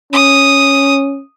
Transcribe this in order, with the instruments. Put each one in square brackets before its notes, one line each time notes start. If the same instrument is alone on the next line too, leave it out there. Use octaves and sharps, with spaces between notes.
[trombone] C#4 [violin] D#6